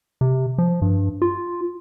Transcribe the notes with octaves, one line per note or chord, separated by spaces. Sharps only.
C3
F3
G2
F4